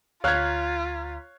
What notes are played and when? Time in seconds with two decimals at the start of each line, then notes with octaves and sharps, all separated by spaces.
0.24 D2 F4 C#5 F5 A#5 F#6 G#6 B6